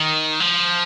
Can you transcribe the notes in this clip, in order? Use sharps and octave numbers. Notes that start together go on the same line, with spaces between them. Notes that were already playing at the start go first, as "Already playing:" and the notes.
Already playing: D#3
F3